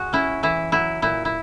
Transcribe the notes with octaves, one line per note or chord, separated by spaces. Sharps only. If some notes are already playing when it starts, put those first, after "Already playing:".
Already playing: G#3 F#4
C#4 E4
E3 E4
F#3 E4
A#2 E4
E4